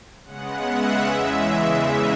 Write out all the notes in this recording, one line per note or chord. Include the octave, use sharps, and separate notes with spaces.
C#3 G#3 B3 F#5
E5
E2 C#3 E3 G#3